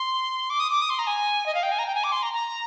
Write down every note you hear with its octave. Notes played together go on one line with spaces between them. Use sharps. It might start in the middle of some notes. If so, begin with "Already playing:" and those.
Already playing: C6
D6
D#6
D6
D#6
C6
A#5
G#5
D#5
F5
G5
G#5
A#5
G5
G#5
D6
C6
A#5
A#5